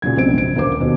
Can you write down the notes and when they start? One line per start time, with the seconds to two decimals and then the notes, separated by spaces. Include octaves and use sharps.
0.02 A#2 C#3 F#3 G#6
0.17 A#1 B2 C4 D4 D7
0.34 F#1 D7
0.55 D2 A#3 D4 C5 D6
0.80 D#2 B2